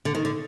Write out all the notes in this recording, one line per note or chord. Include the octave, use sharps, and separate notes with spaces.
D3
D#3
D3